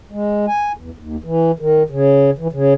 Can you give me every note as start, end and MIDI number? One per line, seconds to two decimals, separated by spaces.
0.12 0.46 56
0.48 0.72 80
0.77 0.90 40
0.98 1.16 39
1.24 1.51 52
1.59 1.83 51
1.90 2.31 49
2.39 2.48 52
2.53 2.74 49